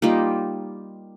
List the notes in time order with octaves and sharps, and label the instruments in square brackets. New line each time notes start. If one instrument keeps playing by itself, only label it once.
[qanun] G3 A#3 D#4 F4